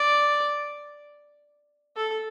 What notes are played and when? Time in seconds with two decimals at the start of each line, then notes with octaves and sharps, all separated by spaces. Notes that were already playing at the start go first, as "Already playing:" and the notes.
Already playing: D5
1.96 A4